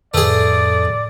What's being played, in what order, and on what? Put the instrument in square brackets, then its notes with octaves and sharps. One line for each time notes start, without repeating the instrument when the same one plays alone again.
[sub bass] F2 [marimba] A2 B4 [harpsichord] A3 G#4 [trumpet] D5